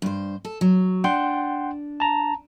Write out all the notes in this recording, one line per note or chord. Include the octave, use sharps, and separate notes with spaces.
G2 C5
A4
F#3
D4 F#5 G5 C6
A5 A#5